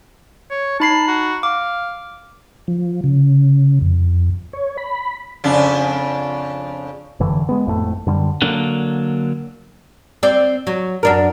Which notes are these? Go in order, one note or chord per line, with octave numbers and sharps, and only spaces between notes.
C#5
D#4 A5 B5 C7
F#4
F5 D6
F3
C#3
F2
C#5
B5
F2 C#3 D4
F1 G2 D3 E3
G#3 B3
G#1 F2 A2 A3
F#2 D3 G3
D3 F#3 A#3 D4
C4 D5
F#3
F#2 D4 A#4